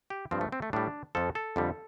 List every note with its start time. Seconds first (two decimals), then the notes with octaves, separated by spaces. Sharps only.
0.10 G4
0.31 G2 F3 C4
0.41 A3
0.52 C4
0.62 A3
0.73 A2 G3 D4
1.15 F2 F3 A4
1.35 A4
1.56 F2 D3 G3